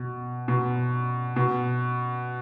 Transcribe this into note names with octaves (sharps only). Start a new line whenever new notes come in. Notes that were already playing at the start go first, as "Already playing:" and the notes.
Already playing: B2
B2
B2